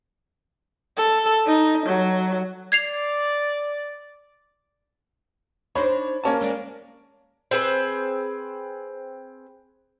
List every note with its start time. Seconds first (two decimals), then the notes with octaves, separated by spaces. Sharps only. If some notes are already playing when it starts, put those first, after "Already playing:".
0.97 A4
1.46 D#4
1.86 F#3
2.72 D5 G#6 C7 F7
5.75 D4 D#4 C5 C#5 B5
6.24 A#3 C#4 A5
6.41 G#3 A#4 D5
7.51 C4 G#4 A4 B4